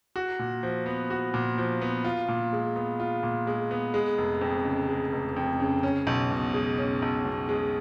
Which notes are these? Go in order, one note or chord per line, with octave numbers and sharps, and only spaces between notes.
F#4
A#2
F3
B3
F#4
A#2
F3
B3
F4
A#2
G#3
B3
F4
A#2
G#3
B3
G#3
F1
F2
C#3
G#3
F1
F2
C#3
C#4
B1
B2
G#3
C#4
B1
B2
G#3